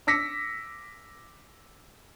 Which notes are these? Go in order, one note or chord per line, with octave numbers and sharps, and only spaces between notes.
D6 E6 A#6 B6 C#7